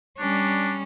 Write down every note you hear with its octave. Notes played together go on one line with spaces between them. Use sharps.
G3 C#4 D4